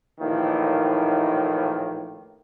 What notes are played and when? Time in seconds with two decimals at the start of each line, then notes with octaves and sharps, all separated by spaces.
0.19 A#1 D#2 A2 D#3 E3 A#3